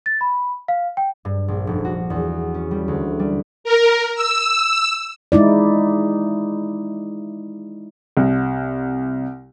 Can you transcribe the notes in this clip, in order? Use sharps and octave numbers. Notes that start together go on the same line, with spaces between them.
A6
B5
F5
G5
G2
A#1
F1
F#4
E2
C#4
G3
D2
G3
A#4
E6
G#3 D#4 E4 D5
C2